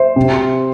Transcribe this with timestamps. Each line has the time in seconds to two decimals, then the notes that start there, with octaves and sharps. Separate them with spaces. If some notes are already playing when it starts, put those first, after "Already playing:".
Already playing: C5 E5
0.16 C3